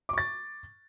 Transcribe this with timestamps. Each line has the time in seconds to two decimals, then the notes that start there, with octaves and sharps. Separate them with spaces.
0.09 D6
0.13 C#6
0.18 A6